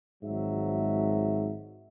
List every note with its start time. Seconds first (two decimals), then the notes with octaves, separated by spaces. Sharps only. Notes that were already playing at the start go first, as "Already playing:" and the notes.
0.24 G#1 G#2 F3 F#3 E5